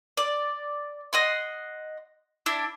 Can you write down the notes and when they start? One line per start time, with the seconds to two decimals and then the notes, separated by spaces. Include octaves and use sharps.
0.17 D5
1.13 D#5 F#5 C6
2.46 D4 E4